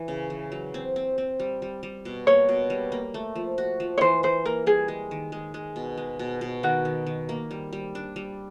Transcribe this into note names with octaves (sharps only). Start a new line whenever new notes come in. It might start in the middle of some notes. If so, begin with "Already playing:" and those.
Already playing: E3
C#3
E3
F#3
C4
C4
C4
G3
G3
G3
B2
A#3 C#5
B2
G3
A#3
A3
F3
F#4
F3
C#5
E3 C5
E3 C5
A#3 A#4
G3 G#4
G#3
D#3
G#3
G#3
B2
G#3
B2
B2
D#3 F#4
D#3
D#3
A#3
G3
G3
D4
G3